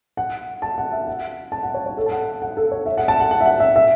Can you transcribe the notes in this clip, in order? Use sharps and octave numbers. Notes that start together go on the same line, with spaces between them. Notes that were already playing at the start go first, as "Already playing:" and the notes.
F#5
A5
F#5
E5
F#5
A5
F#5
C#5
C#5
A4
A5
F#5
F#5
A4
C#5
E5
F#5
A5
F#5
F#5
E5
F#5
E5
E5